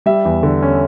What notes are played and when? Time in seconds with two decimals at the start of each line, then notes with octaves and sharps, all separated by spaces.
0.06 G3 E5
0.25 E2
0.43 D3
0.62 C#4